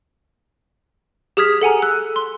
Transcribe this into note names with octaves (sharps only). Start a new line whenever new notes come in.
G4 G#4 D#6 F6 G#6 B6
A4 F#5 G#5 A#5
E6 F#6
C6